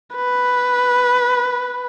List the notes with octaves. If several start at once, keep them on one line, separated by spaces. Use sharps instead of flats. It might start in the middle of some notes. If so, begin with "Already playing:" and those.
B4